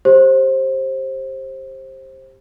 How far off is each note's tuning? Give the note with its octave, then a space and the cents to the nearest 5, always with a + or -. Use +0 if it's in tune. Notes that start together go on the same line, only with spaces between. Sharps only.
G4 +10 C5 +20